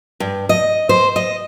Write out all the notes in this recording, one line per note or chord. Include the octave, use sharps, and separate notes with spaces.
G2
D#5
C5
D#5